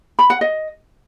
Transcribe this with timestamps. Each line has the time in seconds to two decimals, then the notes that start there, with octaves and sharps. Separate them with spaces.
0.19 B5
0.30 F#5
0.41 D#5